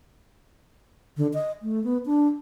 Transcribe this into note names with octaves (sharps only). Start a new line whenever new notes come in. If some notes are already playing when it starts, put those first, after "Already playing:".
D3
D#5
A3
B3
D4